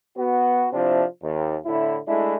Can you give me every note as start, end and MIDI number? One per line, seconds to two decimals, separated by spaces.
0.17 0.67 59
0.17 0.67 66
0.72 1.02 48
0.72 1.02 53
0.72 1.02 60
0.72 1.02 62
0.72 1.02 64
1.22 1.55 39
1.65 1.97 45
1.65 1.97 50
1.65 1.97 64
2.07 2.35 56
2.07 2.35 57
2.07 2.35 62
2.07 2.35 64